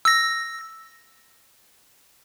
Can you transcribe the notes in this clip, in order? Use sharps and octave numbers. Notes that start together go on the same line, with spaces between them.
E6 A#6